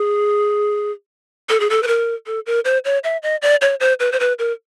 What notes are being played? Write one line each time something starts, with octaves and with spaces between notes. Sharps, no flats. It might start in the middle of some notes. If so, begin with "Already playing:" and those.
Already playing: G#4
A4
G#4
A4
B4
A#4
A4
A#4
C5
C#5
E5
D#5
D5
C#5
C5
B4
C5
B4
A#4